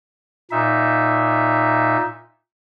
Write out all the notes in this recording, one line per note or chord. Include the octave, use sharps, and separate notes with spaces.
A#2 D#4 E5